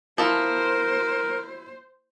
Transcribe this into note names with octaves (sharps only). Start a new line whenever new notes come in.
F3 E4 A4 A#4 C5